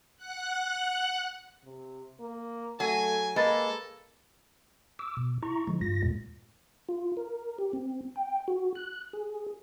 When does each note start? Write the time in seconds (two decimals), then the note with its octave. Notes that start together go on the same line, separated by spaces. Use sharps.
0.17 F#5 F#6
1.65 C3
2.20 A#3
2.80 F#3 A3 G#5
3.36 G#3 A#3 A4 B4 B5 A6
4.99 D6 E6
5.17 B2
5.43 E4 A#5 C#6
5.67 D3 F3 G#3
5.81 G2 F4 A#6
6.03 E2 A#2 G#3
6.89 F4
7.17 A#4
7.59 G4
7.73 C4
8.16 G5
8.48 F#4
8.75 F#6
9.13 G#4